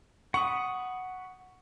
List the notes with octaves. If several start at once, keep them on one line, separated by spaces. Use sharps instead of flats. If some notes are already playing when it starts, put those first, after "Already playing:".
F#5 B5 C#6 D#6